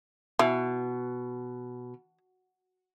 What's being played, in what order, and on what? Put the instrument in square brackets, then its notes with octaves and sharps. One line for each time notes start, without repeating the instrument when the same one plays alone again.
[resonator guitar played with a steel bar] B2 [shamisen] E3